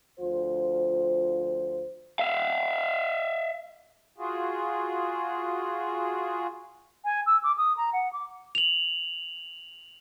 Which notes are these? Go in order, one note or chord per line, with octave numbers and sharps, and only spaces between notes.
D2 F3 F4 C5
E5 F5
F4 F#4 G#4
G#5
E6
D6
D#6
A#5
F#5
D6
F7 F#7